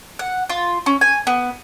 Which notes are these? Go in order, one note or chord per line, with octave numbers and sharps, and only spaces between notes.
F#5
F4
C#4
G#5
B3